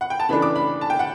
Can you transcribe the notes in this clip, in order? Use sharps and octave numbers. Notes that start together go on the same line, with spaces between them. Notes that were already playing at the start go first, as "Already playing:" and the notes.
F#5
G5
A5
C#3 E3 A3 D4 B5
D6
B5
A5
G5
F#5